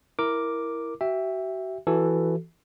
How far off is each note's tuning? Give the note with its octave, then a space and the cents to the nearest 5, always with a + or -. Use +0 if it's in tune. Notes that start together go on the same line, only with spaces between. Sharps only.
E4 +0 A#4 +0 D6 +0
F#4 +40 E5 +0 G5 +20
E3 +10 F#4 +20 A4 +0